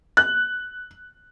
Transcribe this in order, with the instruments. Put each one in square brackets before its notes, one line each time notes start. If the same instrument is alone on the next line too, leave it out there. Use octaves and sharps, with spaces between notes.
[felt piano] F#6